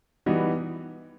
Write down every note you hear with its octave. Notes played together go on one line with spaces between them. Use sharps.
E3 G3 B3 D#4 F#4